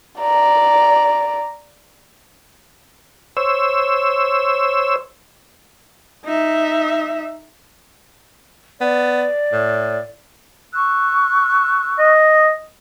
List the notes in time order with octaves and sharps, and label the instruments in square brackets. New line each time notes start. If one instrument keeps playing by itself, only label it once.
[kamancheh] D5 A#5
[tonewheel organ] C5 C#5 E6
[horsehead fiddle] D#4 E5
[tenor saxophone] B3 [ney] D5
[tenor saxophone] A2
[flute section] C#6 E6 F#6
[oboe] D#5